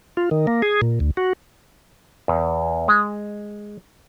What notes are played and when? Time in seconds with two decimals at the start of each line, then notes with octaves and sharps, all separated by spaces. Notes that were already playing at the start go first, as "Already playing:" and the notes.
0.17 F4
0.31 D#3
0.47 A#3
0.62 G#4
0.81 A#2
1.00 D2
1.17 F#4
2.28 E2
2.88 G#3